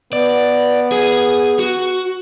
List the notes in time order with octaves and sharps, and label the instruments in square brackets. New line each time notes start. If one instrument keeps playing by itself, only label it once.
[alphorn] B3 [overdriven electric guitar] D5
[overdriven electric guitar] G#4
F#4